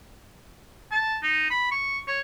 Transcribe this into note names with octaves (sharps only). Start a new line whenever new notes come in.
A5
D#4
B5
C#6
C#5